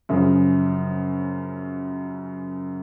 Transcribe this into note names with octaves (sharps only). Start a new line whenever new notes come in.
F#2 C#3 F3